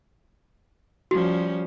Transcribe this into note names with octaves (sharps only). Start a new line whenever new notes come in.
F3 G3 C#4 F#4